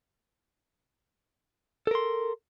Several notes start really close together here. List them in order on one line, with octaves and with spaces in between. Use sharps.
A4 A#4 C6